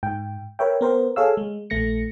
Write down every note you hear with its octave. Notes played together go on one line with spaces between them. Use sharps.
G#2 G5
A#4 B4 C#5 E5 G5
B3 A#4 C5
G#4 A4 C#5 F5 E6
G#3
A#1 A3 A#6 C#7